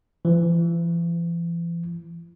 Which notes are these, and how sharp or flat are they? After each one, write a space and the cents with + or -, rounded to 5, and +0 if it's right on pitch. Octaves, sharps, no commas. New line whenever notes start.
E3 +45